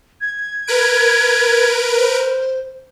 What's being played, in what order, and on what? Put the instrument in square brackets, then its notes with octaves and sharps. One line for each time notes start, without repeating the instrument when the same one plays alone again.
[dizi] G#6
[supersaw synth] A#4 B4 D7
[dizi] C5